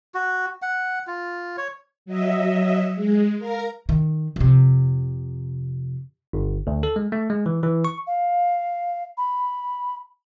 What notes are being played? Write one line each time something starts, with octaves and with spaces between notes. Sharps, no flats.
F#4
F#5
F4
C#5
F#3 D#5 E5
G#3
A#4 F5 A#5
D#3
F2 C3
G1
D2
A4
G#3
A3
G#3
E3
E3
C#6
F5
B5